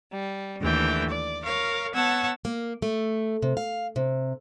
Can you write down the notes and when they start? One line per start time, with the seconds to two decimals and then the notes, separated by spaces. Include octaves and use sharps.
0.12 G3
0.60 D#2 D3 E3 A3 G5
1.09 D5
1.42 A#4 C#5 F5
1.94 B3 C#5 F#5 A5 E6 G#6
2.45 A#3
2.82 A3
3.42 C3
3.57 F5
3.96 C3